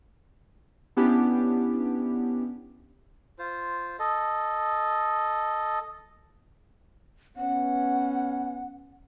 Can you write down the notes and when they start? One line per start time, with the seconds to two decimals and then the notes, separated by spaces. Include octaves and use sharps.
0.97 B3 C#4 D4 E4 G4
3.39 F4 C5
3.99 A4 D#5
7.37 B3 C#4 F#5